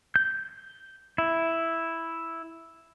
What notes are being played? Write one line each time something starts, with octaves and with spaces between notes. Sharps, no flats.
G6
E4